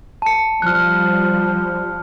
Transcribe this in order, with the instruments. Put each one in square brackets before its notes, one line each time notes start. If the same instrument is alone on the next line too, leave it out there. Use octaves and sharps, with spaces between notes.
[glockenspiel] A5 C#7
[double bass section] F3 G3 [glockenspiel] F6 F#6